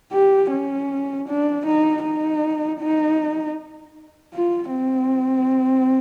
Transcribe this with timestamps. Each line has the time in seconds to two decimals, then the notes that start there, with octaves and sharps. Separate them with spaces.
0.12 G4
0.52 C#4
1.28 D4
1.66 D#4
2.04 D#4
2.80 D#4
4.34 F4
4.72 C4